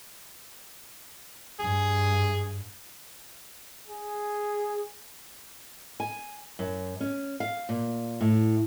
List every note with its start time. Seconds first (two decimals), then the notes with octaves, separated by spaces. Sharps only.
1.60 G2 G#4
3.88 G#4
6.00 G#5
6.59 F#2
7.01 C#4
7.40 F5
7.69 A#2
8.21 A2